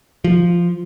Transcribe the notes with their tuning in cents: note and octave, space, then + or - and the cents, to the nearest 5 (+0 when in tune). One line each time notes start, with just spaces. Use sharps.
F3 -5